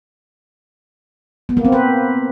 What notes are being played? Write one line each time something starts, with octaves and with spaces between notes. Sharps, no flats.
B3
A#3
C4
B4